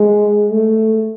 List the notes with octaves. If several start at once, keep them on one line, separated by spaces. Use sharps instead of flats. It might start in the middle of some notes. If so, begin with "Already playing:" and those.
Already playing: G#3
A3